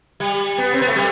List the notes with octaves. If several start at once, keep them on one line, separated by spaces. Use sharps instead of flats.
G3
B3
C4
B3
A3
G3